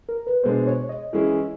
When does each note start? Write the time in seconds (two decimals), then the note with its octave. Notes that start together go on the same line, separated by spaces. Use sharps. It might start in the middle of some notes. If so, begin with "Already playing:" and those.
0.09 A#4
0.27 B4
0.43 B2 G#3 B3 D4 C5
0.67 C#5
0.89 D#5
1.13 E3 G#3 C#4 E4 G#4